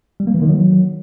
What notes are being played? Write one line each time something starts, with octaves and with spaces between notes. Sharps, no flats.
G3
A#3
E3
D#3
F#3